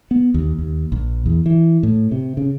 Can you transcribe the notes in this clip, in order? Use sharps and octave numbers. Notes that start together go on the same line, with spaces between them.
B3
D#2
D#2
A#1
E2
E3
A2
C3
C#3